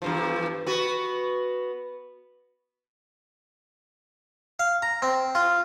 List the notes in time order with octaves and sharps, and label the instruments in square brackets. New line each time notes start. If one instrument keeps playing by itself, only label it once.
[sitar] E2 G2 F3
B3 F#4
[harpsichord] F5
A#5
C4
F4